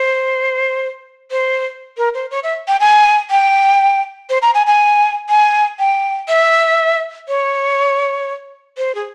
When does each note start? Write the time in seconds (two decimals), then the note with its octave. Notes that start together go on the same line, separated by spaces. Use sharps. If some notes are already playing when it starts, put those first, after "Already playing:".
Already playing: C5
1.31 C5
1.97 A#4
2.14 C5
2.31 C#5
2.43 E5
2.68 G5
2.80 G#5
3.30 G5
4.30 C5
4.42 A#5
4.54 G#5
4.67 G#5
5.29 G#5
5.79 G5
6.28 E5
7.28 C#5
8.78 C5
8.95 G#4